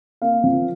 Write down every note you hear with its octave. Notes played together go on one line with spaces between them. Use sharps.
A#3 F5
F3